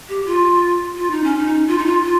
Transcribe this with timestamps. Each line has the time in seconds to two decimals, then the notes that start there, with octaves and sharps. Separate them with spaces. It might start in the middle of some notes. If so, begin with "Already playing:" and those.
0.09 G4
0.26 F4
0.97 F4
1.11 D#4
1.24 C#4
1.38 D#4
1.68 F4
1.78 D#4
1.86 F4
2.03 F4